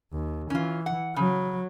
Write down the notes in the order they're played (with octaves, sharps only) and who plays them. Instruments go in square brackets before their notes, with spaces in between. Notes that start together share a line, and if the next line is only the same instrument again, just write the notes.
[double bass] D#2
[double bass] E3 [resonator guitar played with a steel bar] C#4 F4
[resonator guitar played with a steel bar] F#5
[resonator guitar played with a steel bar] C#3 [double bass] F#3